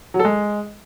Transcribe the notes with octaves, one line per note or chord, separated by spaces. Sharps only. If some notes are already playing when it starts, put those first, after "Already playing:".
F#3
A4
G#3